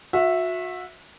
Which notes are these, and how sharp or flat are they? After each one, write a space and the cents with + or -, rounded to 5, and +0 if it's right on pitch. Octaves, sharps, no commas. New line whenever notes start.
F#4 -35 E5 +0